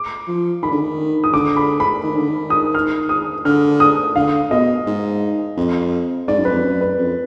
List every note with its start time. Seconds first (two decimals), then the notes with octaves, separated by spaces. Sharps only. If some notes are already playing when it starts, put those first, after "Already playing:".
Already playing: D6
0.28 F3
0.62 D#3 B5
0.72 D3
0.81 D#3
1.24 D#6
1.33 D3 D6
1.56 B5
1.80 B5
2.04 D#3
2.16 D3
2.29 D#3
2.50 D#6
2.74 F6
3.09 D#6
3.45 D3 F6
3.80 D#6
4.16 D3 F5
4.51 B2 D#5
4.86 G#2
5.57 F2
6.28 G#2 D5
6.38 F#2
6.45 F2 B4
6.61 F#2
6.81 B4
6.98 F2